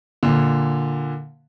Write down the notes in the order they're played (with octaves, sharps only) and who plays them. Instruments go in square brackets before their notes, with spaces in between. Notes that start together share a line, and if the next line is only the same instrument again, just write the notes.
[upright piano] A#2 D3